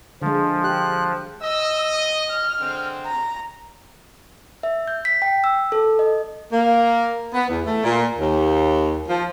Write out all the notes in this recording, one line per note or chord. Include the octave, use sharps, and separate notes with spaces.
D3 F3 G#3
G4 F#6
D#5 E6
D#6
F6
D3 G#3 C4
A#5
E5
G6
B6
G5
E6
A4
D#5
A#3
B3
E2
A3
A#2
D#2
F3